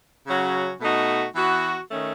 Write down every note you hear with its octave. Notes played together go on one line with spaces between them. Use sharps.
C#3 F#3 C#4 F#4
B2 A3 D#4 F#4
E3 B3 F#4
D#3 A3 C#4